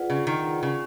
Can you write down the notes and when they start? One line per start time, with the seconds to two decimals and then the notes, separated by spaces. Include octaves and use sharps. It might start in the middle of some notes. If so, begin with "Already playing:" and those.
Already playing: F4 G#4 B4 D5 F#5
0.10 C#3
0.27 D#3
0.63 C#3